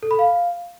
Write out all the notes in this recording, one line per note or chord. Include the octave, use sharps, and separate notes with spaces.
A4
B5
F5